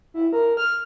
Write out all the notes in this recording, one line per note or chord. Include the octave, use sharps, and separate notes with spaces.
E4
A#4
F6